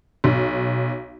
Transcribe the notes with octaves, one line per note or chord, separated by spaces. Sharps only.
B1